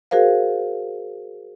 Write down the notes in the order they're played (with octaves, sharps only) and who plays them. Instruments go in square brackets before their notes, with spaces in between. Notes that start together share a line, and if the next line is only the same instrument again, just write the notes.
[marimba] F#4 G#4 A#4 C5 F5